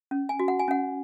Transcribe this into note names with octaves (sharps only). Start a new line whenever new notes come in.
C#4
G#5
F#4
F#5
G#5
C#4 F#5